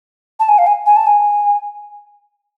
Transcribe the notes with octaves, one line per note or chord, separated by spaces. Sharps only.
A5
G#5
F5
G#5
G#5
A5
G#5